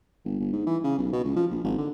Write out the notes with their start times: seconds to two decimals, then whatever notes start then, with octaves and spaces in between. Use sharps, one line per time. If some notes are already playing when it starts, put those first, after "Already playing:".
0.25 G1
0.40 G1
0.53 G#2
0.66 E3
0.84 C#3
0.98 B1
1.12 B2
1.24 C#2
1.36 F3
1.50 A#1
1.64 G#1
1.78 D3